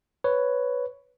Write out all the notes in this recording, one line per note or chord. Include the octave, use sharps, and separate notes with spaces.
B4 C#5